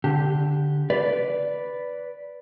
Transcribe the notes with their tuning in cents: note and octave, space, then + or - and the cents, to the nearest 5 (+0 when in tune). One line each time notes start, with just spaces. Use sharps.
D3 +0 G4 +0
B4 +0 D5 -10